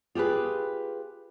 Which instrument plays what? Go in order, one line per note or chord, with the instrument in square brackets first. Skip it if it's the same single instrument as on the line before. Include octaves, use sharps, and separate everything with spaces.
[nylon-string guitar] F4 G4 G#4 B4